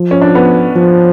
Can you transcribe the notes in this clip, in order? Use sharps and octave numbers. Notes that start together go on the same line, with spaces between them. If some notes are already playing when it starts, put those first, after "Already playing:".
Already playing: F3
C#4
D4
B3
F3